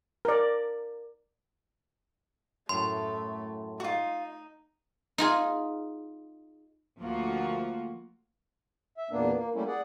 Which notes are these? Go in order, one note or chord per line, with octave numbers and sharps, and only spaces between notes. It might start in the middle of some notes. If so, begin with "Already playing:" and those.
A#4 D5
F#2 A2 A3 C6
D#4 F4 F#4
D#4 F4 G#4
D2 F3 A#3 F4 F#4
E5
E2 A#2 A#3 B3 D4
A#3
G3 A3 A#3 C#4 E4
G#4 D5 F#5